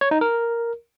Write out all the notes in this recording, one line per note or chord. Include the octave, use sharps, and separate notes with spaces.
C#5
D#4
A#4